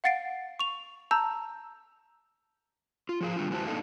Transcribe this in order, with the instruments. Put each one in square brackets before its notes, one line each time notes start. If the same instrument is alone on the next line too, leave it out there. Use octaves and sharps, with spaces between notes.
[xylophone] F5 F#5 A6 C7 D7
C#6 F7
A5 A#5 E6 G6
[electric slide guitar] F4
F3 G#4 F5
D#3 G3 D4 F4
E2 G#3 E4 F#4 C5 A5
A#3 D4 D#4 A4 D#5 F5